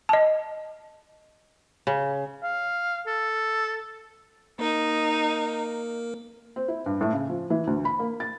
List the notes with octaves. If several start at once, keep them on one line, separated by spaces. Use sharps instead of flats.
D#5 A5
C#3
F5
A4
A#3 D#4 A#4
C4
E4
G2
A2
C#3
F3
E3
D2
B5
A#3
A6